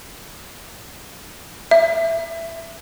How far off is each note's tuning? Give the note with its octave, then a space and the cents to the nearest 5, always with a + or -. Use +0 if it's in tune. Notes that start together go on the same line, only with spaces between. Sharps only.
E5 +10